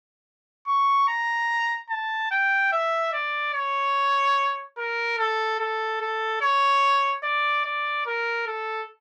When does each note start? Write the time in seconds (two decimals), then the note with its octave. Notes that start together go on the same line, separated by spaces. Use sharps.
0.67 C#6
1.08 A#5
1.90 A5
2.31 G5
2.72 E5
3.13 D5
3.54 C#5
4.78 A#4
5.18 A4
5.59 A4
6.01 A4
6.41 C#5
7.24 D5
7.65 D5
8.06 A#4
8.47 A4